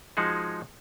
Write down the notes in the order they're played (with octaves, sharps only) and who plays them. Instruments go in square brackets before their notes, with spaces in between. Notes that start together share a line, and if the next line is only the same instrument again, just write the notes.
[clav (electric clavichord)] F3 G#3 D#4 F#4 G#4